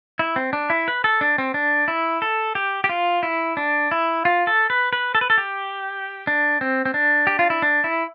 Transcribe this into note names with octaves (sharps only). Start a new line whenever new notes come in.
E4
C4
D4
E4
B4
A4
D4
C4
D4
E4
A4
G4
G4
F4
E4
D4
E4
F4
A4
B4
B4
A4
B4
A4
G4
D4
C4
C4
D4
G4
F4
E4
D4
E4